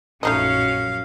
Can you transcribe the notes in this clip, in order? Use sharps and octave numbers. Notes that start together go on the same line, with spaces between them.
A#1 F#2 A3 C#4 D#4 F#4 D#5 F5